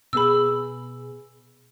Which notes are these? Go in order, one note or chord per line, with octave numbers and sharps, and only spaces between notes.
B2 B3 G#4 B5 E6